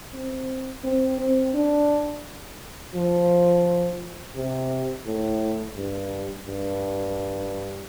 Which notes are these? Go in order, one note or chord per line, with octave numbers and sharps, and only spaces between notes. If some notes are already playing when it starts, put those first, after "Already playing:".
C4
C4
C4
D4
F3
C3
A2
G2
G2